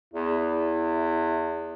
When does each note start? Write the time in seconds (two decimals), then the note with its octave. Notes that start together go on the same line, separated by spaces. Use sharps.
0.14 E2 E4